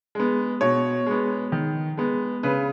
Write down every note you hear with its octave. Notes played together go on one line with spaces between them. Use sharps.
G#3 B3
B2 C#5
G#3 B3
D#3
G#3 B3
C#3 B4